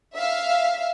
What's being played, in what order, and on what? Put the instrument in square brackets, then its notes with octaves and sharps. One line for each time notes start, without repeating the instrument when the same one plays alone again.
[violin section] E5 F5